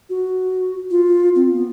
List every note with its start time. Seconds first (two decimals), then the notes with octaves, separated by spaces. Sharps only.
0.10 F#4
0.91 F4
1.35 C4
1.53 B3